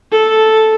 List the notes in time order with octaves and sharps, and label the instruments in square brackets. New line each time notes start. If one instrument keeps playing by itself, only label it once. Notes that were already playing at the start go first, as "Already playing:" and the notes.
[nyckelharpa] A4